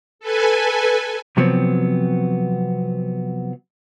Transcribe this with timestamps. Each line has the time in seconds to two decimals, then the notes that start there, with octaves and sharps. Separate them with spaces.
0.19 A4 B4 G#5
1.37 C3 F3 F#3 B3 C4